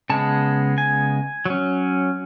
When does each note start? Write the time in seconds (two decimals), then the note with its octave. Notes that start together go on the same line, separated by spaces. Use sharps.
0.10 C#3 G#3 B3 A5
0.78 G#5
1.45 F#3 C#4